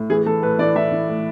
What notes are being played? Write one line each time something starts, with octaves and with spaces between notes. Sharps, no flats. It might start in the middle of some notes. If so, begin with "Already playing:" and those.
Already playing: A2
E3 G#4
E3 A4
A2 B4
E3 D5
E3 E5
E3
A2